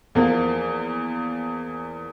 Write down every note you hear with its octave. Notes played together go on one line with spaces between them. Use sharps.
E2 F3 A#3